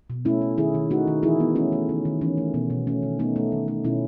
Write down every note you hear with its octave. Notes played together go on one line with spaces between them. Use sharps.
B2
A3 C#4 E4
A3
D#3 E4 G#4
D#3
A3 D#4 F#4
D#3
E3 E4 G#4
B3
A3 C#4 E4
A3
D#3
D#3
E3 C#4
A3
B2 B3
B2
A3 C#4
D#3
A3 B3 D#4
A3
D#3
A3
B2 C#4 E4